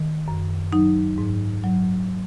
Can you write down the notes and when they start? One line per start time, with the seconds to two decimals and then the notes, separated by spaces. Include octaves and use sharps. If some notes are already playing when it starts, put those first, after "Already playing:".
Already playing: D#3
0.28 F#2
0.73 F#3 D#4
1.18 G#2
1.64 F#3